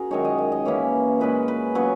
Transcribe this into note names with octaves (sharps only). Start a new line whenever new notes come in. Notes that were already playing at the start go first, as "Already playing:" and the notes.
Already playing: C#4 F#4 G#4 A#4
F#2 D#3 G#3 D#4 C#5
D#5
D#5
D#5
F#2 E3 A#3 C#4 C#5
A#2 G#3 C#4 B4
B4
C#3 F#3 B3 C#5